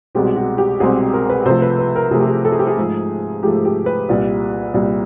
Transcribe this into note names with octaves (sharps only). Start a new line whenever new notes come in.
C2 B2 G#3 C4 G4
F#4
G4
C2 B2 G#3 C4 G#4
A#4
B4
C3 F3 A3 C5
B4
B4
A#4
C3 F3 A3 G#4
G4
G#4
A4
G#4
G4
G#4
G#2 F3 A3
G#2 F3 A3 G4
G4
B4
C2 A#2 G3
C2 A#2 G3